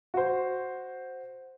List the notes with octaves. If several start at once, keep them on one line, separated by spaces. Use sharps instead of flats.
F#4 C5